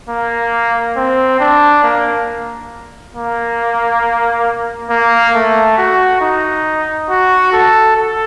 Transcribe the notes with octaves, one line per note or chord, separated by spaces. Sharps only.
A#3
C4
D4
A#3
A#3
A#3
A3
F#4
D#4
F#4
A4
A4